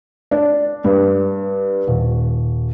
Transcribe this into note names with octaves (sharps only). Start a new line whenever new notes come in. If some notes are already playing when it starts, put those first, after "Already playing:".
D4
G2
D#1